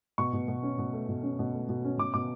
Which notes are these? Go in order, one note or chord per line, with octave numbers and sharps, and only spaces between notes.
B2 C#6
B2
B2
C#4
B2
A3
B2
C#4
B2
A3
B2
C#4
B2 D6
B2 D6